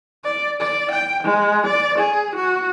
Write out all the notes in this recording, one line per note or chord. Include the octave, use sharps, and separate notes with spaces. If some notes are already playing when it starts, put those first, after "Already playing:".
D5
D5
G5
G#3
D5
G#4
F#4